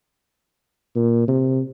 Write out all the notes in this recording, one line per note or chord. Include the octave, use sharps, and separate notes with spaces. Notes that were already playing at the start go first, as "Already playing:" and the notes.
A#2
C3